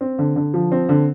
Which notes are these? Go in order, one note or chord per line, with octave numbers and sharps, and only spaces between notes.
C4
D3
D3
F3
C4
D3